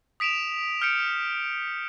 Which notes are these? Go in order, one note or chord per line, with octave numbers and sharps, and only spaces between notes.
D#6 B6 D7 E7 F7
F6 G6 C#7 D7